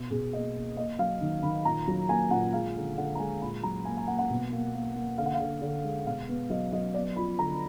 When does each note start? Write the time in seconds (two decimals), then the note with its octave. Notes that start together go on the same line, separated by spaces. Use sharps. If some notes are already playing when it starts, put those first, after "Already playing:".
Already playing: B2
0.10 B2 G#4
0.33 A#3 D#5
0.55 A#3
0.76 A#3 D#5
0.99 F#3 F5
1.21 D#3
1.43 D#3 B5
1.65 A#2 A#5
1.88 F#3
2.09 A#3 G#5
2.31 A#2 F#5
2.53 G#3 F5
2.76 D3
2.97 D3 F#5
3.15 A#5
3.19 G#3 G#5
3.41 A#2 B5
3.63 F#3 A#5
3.85 A#3 G#5
3.97 G#5
4.07 A#3 F#5
4.19 F#5
4.30 B2
4.52 A#3
4.74 A#3
4.96 A#3
5.18 D3 F5
5.26 F#5
5.34 F5
5.40 D3
5.62 D3
5.84 G#3
6.06 B2 F5
6.29 B3
6.50 F#3 D#5
6.72 F#3 D#5
6.94 B3 D5
7.16 F3 B5
7.38 D3 A#5